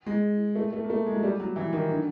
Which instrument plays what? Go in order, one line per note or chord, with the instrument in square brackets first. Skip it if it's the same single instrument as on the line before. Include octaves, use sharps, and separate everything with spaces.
[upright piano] G#3
A3
A3
A#3
A3
G#3
F#3
G3
F#3
E3
D#3
D3